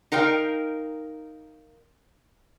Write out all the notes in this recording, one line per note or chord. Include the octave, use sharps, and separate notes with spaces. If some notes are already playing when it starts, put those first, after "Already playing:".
D#4 A#4 F5 G5